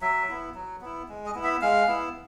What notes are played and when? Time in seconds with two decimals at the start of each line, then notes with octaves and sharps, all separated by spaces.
0.01 F#3 E5
0.29 B3 E4
0.55 F#3
0.81 B3 E4
1.09 G#3
1.26 D#5
1.35 B3 E4
1.44 E5
1.62 G#3 F5
1.88 B3 E4